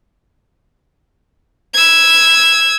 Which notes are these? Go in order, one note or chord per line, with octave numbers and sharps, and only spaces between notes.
E6 G#6